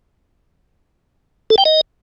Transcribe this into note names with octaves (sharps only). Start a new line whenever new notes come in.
A4
G5
D#5